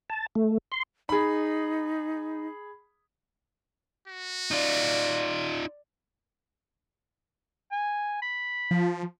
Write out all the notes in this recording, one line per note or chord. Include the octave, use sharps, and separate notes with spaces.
A5
A3
C6
D#4 G#4 B5
F#4
D#4 F4 D5
G#5
B5
F3